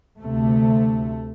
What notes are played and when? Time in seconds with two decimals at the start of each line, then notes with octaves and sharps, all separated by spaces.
0.20 D2 C3 A3